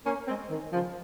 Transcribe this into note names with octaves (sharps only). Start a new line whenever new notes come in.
A#3 C#4
G#3 C4
D#3
C#3 F3